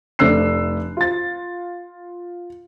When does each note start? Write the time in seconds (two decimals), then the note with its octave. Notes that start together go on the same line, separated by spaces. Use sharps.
0.19 F1 A3 D4 E6 F#6 C7
0.97 F4 A6